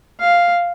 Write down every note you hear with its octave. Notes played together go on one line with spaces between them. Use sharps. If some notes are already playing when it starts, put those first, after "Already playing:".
F5